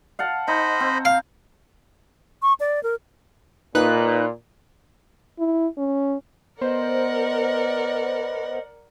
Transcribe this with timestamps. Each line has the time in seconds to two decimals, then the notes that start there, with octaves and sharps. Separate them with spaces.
0.19 F5 F#5 A5
0.48 D#4 C5 D#5 B5
0.80 C4
1.05 F5
2.42 C#6
2.60 D5
2.83 A#4
3.75 A#2 D#4 B4 F#6
5.39 E4
5.78 C#4
6.61 B3 A#4 C5 D5 D#5 F#5